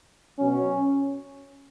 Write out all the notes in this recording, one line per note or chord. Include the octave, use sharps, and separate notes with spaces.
B2 F#3 C#4